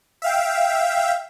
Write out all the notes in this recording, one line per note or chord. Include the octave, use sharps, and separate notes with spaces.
E5 F5 G5